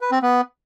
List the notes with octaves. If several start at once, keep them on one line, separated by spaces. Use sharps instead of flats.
B4
C4
B3